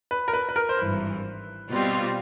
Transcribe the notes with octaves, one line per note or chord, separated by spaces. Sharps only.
B4
A#4
B4
B4
A#4
C5
G#1 G2 E3 B4
B2 G3 C4 F4